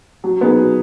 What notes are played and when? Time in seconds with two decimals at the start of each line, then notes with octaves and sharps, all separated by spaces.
0.24 F#3
0.41 B3 D#4 G#4
0.57 F#3